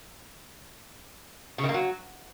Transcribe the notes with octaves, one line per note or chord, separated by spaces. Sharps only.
C#3
D#3
A#3
F#3